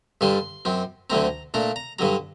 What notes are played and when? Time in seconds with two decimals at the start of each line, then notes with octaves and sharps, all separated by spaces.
0.21 G2 D3 G3 D4 C6
0.65 F#2 F#3 C4
1.10 D2 D3 F#3 A3 C4 A#5
1.54 A#2 A3 D4 A#5
1.76 A#5
1.99 G2 D3 F#3 A#5